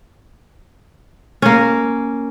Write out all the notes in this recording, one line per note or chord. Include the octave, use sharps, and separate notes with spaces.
A#3 C#4